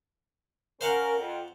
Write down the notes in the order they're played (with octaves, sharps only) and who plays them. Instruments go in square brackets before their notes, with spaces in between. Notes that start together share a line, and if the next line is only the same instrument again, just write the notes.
[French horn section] C#4 A#4 [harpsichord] C5 F5 F#5
[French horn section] F2